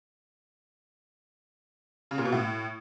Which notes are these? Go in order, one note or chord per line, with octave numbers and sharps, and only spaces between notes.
C#3
A#2
B2
A2